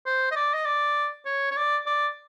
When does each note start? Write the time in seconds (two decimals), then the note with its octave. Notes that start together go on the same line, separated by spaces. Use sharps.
0.06 C5
0.31 D#5
0.36 D5
0.54 D#5
0.66 D5
1.25 C#5
1.51 C#5
1.57 D5
1.86 D5